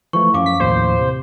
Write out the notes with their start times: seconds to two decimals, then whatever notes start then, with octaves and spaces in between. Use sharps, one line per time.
0.13 E3 F3 A3 C#6
0.34 F#2 F3 C#4 F5 D6
0.46 B6
0.60 D#2 A2 F3 C5
0.99 C3